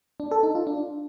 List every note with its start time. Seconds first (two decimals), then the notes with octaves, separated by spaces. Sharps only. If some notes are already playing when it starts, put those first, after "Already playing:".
0.20 D4
0.31 A4
0.43 D#4
0.55 F4
0.67 D4